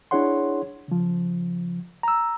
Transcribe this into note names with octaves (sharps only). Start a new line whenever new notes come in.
D4 E4 G#4 C#5 F#5 C6
C#3 F3
A#5 E6